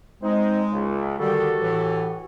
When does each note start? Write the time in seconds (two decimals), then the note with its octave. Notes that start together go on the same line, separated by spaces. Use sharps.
0.22 G#3 C4 D#4 C5
0.73 C#2
1.20 D3 D#3 G3 F#4 G4 A4
1.61 A2 E3